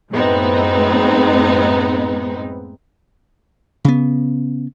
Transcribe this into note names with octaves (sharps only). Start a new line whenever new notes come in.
F#2 A2 G#3 B3 C4 D#4
C#3 B3